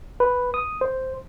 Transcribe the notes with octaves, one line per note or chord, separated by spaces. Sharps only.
B4
D#6
C5